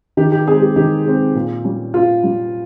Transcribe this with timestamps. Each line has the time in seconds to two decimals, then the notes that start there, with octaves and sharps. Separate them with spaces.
0.17 D#3 G4
0.32 G4
0.47 C4 G#4
0.52 G#3
0.62 G4
0.76 D#3 G4
1.06 G#3 C4
1.35 A#2
1.64 G3 C#4
1.94 A#2 F4
2.23 G3 C#4